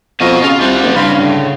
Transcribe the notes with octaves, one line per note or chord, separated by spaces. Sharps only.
F2 B2 F#4 D#5 F5
C#3 F4
C2 G3 F4 F#5
F#1
G2 C#3 F5 B5 C6
A2 D3